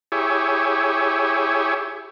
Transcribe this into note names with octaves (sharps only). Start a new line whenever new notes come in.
E4 G4 G#4 C#5